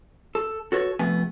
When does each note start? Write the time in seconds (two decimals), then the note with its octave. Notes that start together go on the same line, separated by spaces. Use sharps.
0.35 A4
0.72 F#4 A4 B4 C#5
0.99 C3 F3 A3 B3 G#5